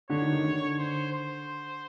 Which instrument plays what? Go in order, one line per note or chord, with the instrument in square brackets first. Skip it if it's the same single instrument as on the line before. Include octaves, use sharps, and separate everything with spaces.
[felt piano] D3 [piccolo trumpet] C#5
[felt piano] D#3
D#3
D3
[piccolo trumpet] C5
C5